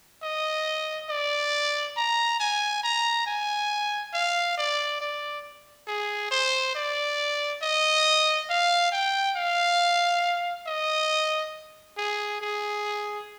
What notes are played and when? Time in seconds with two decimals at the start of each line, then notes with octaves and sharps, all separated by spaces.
0.23 D#5
1.10 D5
1.97 A#5
2.40 G#5
2.84 A#5
3.26 G#5
4.14 F5
4.58 D5
5.01 D5
5.88 G#4
6.31 C5
6.75 D5
7.62 D#5
8.50 F5
8.92 G5
9.36 F5
10.67 D#5
11.98 G#4
12.41 G#4